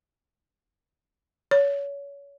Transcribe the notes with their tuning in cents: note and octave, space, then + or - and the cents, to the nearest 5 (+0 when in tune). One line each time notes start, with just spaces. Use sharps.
C#5 +30